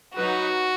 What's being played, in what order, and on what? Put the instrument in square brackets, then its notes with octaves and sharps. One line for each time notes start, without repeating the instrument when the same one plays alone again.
[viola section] F#3 D#4 B4 [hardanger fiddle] F#4